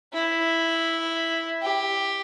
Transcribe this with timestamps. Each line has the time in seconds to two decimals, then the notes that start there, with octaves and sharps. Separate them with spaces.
0.13 E4
1.63 G4